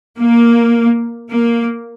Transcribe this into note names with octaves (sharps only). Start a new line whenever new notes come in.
A#3
A#3